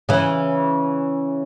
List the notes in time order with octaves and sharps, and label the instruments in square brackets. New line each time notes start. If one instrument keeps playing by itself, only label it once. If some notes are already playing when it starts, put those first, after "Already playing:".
[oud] C#3 E3